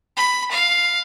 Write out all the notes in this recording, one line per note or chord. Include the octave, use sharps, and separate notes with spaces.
B5
F5